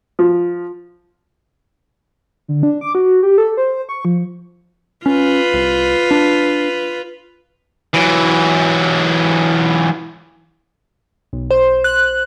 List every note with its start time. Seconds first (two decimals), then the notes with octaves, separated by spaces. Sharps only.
0.19 F3
2.48 D3
2.63 D4
2.81 D6
2.95 F#4
3.23 G4
3.38 A4
3.57 C5
3.89 C#6
4.05 F3
5.06 C#4 F4 B4
5.54 C2
6.11 D4
7.94 E3 F#3
11.33 B1
11.51 C5
11.84 F#6